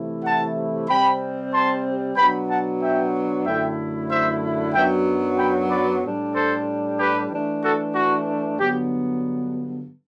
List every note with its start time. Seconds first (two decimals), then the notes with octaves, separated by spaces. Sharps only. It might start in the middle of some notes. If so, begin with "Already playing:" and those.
Already playing: C3 E3 A3 E4
0.24 F#5 A5
0.89 C3 G3 C4 G5 B5
1.53 A5 C6
2.17 B2 F#3 B3 D4 G5 B5
2.50 F#5 A5
2.81 E5 G5
3.45 F#2 D3 A3 E4 E5 G5
4.09 C5 E5
4.74 F#2 F#3 B3 D4 E5 G5
5.38 G5 B5
5.70 B4 D5
6.03 A2 G3 D4
6.35 A4 C5
6.98 G4 B4
7.31 E3 A3 D4
7.63 F#4 A4
7.95 F#4
8.59 G2 D3 F#3 B3 G4